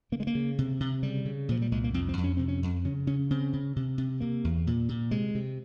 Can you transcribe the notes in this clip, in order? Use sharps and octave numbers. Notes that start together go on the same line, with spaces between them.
C#3 A#3
G#3
A#3
C#3
C3
C3
C#3 G3
C#3
A#2 F3
G3
C2 G#3
A#3
F2 C4
C4
F2
C#4
C3 C4
C#4
F2
C#3 C#4
C#3 C#4
C#3 C4
C#3
C3
C3
C3 A#3
E2
A#2
A#2
C3 G#3
C3